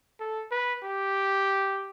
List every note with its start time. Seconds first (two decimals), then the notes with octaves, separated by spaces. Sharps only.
0.20 A4
0.51 B4
0.84 G4